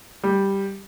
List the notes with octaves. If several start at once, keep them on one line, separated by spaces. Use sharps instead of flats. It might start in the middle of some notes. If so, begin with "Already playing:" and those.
G3